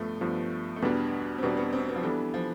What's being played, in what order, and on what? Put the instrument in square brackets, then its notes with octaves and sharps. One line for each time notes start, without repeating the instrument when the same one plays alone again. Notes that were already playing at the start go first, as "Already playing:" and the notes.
Already playing: [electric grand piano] G2 F3 B3 [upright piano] A3
[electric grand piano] G2 F3 B3
[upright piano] A3
[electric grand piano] E2 B2 G3 D4 [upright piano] B3
[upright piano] C4
[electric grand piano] E2 B2 G3 D4 [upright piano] B3
[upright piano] B3
C4
B3
F3
[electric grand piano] E3 B3 D4 A4 [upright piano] G3
[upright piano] F3